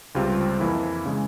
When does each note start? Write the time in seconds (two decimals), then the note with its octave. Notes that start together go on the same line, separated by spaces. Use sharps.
0.15 C#2 C3 G3 C4 F4
0.60 F2 E3 A#3 E4
1.06 C#3 E3 G#3